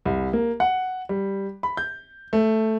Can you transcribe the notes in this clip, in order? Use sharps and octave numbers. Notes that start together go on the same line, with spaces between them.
C2
A#3
F#5
G3
B5
G6
A3